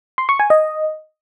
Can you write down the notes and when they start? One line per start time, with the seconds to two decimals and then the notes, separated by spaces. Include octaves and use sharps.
0.18 C6
0.29 C#6
0.40 G#5
0.50 D#5